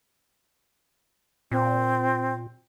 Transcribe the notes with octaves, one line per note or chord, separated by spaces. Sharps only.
A#2 C4